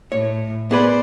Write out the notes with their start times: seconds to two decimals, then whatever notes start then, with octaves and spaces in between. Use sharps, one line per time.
0.12 A2 C#5
0.71 B3 G#4 B4 C5 D5